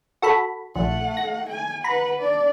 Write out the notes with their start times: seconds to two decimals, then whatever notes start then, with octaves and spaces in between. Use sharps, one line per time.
0.22 F#4 A4 B5
0.76 A#1 A3 F#5
1.17 A#6
1.50 G#5
1.84 B4 F#5 A#5 B5
2.20 D4 D5